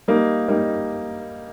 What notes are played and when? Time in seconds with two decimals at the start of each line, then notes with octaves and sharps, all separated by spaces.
0.08 G3 A#3 D#4
0.48 G3 A#3 D#4